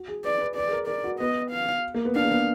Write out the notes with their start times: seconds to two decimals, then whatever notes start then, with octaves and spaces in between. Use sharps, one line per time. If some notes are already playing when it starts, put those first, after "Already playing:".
Already playing: F#4
0.08 G#4
0.24 B4 D5
0.40 B4
0.56 B4 D5
0.67 G#4
0.72 A#4
0.88 A#4 D5
1.04 F#4
1.20 B3 D#5
1.51 F5
1.94 A#3
2.05 B3
2.15 D4 F5
2.25 A#3
2.32 B3